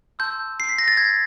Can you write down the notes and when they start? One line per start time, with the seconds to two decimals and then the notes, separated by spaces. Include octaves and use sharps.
0.19 A5 C6 E6 G6
0.60 C7
0.69 B6
0.79 A#6
0.88 A6
0.97 G#6